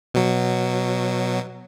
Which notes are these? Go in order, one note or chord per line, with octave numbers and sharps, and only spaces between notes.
B2 F#3